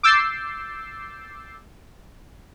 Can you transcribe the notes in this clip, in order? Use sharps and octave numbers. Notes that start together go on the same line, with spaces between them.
D6 E6 G6 A6 C7